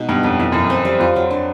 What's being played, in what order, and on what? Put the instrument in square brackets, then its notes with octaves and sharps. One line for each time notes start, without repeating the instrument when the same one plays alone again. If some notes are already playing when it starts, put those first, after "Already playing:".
Already playing: [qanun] B2 G#3 D#4
[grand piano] G2 [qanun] B3
[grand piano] F2 [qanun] F#3
[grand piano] F2 [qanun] E3
[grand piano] F#2 [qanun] E3
[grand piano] F2
[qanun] C4
G3
[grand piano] F2 [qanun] F4
[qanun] F#3
D4